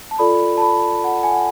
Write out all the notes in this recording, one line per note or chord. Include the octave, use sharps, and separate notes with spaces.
A5
F4 A4 D5 B5
A5
B5
F#5
G#5
F#5